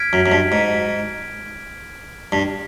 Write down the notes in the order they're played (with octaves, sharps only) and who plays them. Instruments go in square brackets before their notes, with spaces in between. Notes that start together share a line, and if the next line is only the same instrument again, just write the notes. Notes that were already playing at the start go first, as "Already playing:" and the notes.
Already playing: [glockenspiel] F6 G#6 B6 D7
[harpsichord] F#2
F#2
G2
G#2
G2